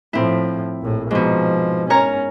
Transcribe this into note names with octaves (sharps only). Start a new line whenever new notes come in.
A2 F3 C4 E4
A#1 A2
G#2 B2 F3
C#4 A#4 C#5 A#5